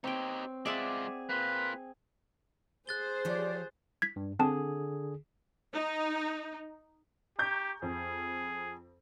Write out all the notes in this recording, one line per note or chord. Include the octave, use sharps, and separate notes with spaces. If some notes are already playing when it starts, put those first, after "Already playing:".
C4 D#4 G4 C#5 G5
G#3 F4 G#4 D5 E5 F#5
A#3 F4 B4
G#4 C5 F#6 A6 G7
F3 G4 C#5 D5
G#6 B6
G2
D3 C4 G#4 A5
D#4
G4 A#5 C#6 G6
F2 G#4